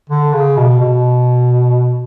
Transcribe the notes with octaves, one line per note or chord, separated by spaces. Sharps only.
D3
C#3
B2
B2